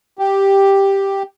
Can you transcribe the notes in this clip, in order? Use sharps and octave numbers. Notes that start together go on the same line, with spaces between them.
G4